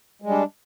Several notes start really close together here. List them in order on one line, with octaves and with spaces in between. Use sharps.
G#3 G3 D4